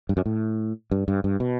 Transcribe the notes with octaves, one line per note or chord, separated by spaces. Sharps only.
G2
F#2
A2
G2
G2
G2
B2